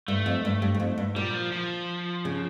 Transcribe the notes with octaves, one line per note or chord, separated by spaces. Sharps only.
G2 A3
F2
G2
G2
G2
F2
G2
A#2 G3
F3
F3
C#3